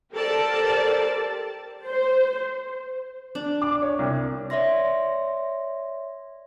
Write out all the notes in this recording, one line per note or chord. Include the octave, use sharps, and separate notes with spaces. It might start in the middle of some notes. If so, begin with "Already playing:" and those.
G4 A4 A#4 C5 D5 A5
C5
D4
D6
C#5
C2
C#5 D5 E5 C6 A#6